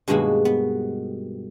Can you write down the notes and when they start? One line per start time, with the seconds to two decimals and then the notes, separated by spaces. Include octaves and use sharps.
0.08 G2 B2 D#3 G#3 A#3 F#4
0.45 B3